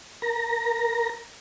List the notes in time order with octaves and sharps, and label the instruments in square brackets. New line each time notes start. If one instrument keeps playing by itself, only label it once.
[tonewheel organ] A#4 A#5